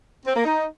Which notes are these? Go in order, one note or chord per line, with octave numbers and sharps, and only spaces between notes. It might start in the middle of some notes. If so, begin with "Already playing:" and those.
C4
A#3
D#4